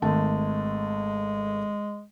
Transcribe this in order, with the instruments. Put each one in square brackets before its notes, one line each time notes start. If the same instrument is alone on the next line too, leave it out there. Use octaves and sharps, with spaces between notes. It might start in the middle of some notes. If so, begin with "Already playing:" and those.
[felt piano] G#1 A3 A5 [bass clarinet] G#3